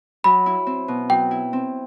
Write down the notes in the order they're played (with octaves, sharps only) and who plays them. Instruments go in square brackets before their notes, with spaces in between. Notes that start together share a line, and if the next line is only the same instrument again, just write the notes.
[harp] F#3 [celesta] B5
[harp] E4
C4
B2
[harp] F#3 [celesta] G5
[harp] E4
C4